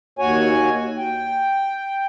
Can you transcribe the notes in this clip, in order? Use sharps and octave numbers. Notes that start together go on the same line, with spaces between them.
D#2 F#4 C#5 G#5
G5